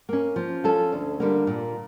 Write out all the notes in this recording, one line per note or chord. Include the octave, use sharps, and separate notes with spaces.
A#3 C#4
F3
C#4 F4 A4
D2
D3 G3 A#3
A#2